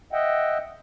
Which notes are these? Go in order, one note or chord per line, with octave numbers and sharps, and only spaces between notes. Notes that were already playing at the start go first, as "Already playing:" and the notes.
D#5 E5 F#5 G5